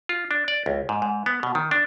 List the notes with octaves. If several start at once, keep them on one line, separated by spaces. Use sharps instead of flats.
F4
D4
D5
C#2
G#2
G#2
B3
B2
D#3
D4